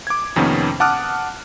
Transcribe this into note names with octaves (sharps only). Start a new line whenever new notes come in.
D6 G#6
F2 C3 D#3 A#3 B3 C#4
F#5 A5 D6 D#6 F6 F#6